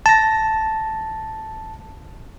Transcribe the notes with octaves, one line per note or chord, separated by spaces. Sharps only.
A5 A#6